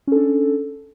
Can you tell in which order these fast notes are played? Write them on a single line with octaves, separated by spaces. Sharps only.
C#4 A4 D4